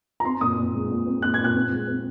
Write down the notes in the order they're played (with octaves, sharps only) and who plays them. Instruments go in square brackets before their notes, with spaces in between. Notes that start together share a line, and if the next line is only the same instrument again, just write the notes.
[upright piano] A#5
C4 C6
A#2 D#6
A#2
G#3
A#2
C4
A#2 F#6
G#6
A#2
F#6
C4
G#3
C4